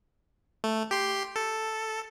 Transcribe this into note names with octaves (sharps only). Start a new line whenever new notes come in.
A3
G4 C6
A4